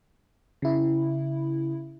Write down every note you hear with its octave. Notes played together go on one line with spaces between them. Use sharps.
C#3 E4